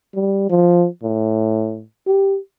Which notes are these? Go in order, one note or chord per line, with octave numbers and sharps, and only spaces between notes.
G3
F3
A2
G4